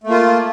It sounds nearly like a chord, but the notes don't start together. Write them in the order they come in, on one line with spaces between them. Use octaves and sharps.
A3 A#3 F4